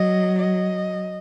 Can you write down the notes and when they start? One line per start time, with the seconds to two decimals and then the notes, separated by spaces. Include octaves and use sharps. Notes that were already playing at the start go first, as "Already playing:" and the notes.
Already playing: F#3 D#5
0.38 D#5